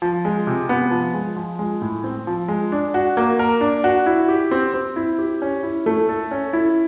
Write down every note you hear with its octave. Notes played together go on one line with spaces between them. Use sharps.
F3
G#3
C3
B3
F3
G#3
F3
G#3
A2
C4
F3
G#3
D4
F#4
A#3
A#4
D4
F#4
E4
G4
C4
C4
E4
G4
C#4
E4
A3
A4
C#4
E4